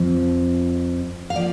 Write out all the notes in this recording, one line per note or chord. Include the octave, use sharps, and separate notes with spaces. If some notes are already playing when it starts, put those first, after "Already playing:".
Already playing: F2 F3 C4
F5
F3 A#3 D5